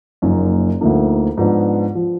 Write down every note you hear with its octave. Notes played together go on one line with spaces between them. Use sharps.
F#1 F#2 F3 A#3 D#4
D2 D3 F3 A#3 D#4
G#2 F3 B3 D4
F3